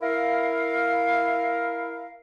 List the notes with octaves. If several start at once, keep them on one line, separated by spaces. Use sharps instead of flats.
E4 A#4 F5